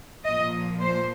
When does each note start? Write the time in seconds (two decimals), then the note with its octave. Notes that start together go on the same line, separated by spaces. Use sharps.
0.25 A#2 F3 A#3 D#5
0.81 C5